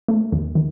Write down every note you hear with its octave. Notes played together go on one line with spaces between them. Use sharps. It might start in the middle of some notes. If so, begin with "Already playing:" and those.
A3
D#2
D#3